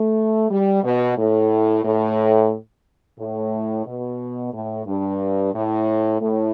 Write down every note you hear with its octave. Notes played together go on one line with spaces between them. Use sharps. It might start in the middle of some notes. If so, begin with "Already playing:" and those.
Already playing: A3
G3
B2
A2
A2
A2
B2
A2
G2
A2
A2